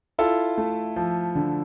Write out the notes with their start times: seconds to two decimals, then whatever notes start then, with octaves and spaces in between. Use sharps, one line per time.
0.18 E4 F4 A4
0.58 A3
0.96 F3
1.35 D3